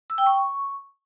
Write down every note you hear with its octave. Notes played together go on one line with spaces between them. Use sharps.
E6
G5
C#6